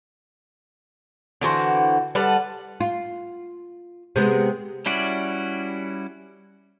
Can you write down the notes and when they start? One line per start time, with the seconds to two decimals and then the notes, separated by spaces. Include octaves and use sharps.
1.41 D3 E3 F#4 C5
2.15 G3 A4 B4 F#5
2.80 F4
4.16 C3 G#3 B3
4.86 G3 C#4 E4 F#4 D5